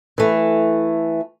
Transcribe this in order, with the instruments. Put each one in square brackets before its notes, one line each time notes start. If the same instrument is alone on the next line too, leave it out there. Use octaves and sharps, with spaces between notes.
[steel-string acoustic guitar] E3 A3